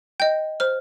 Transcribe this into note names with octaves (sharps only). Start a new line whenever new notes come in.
D#5 G5 G6
C5 F6